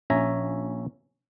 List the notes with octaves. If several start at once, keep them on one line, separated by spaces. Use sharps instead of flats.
A#1 C#4 E5 G#5 A#5